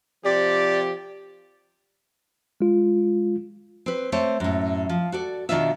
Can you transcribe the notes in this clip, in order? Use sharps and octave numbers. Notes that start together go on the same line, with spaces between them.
C3 F3 G4 D5
G#3 F4
C4 B4
A3 C4 C5 C#5
F#2 A2
F3
F#4 A4 D5
B2 D#3 D4 F4 E5